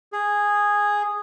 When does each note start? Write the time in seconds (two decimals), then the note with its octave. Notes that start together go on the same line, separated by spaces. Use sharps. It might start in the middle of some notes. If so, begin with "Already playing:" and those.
0.13 G#4